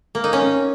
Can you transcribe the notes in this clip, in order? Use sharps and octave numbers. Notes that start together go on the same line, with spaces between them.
A#3
D#4
C#4